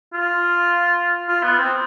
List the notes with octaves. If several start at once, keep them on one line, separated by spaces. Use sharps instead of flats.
F4
F4
B3
C4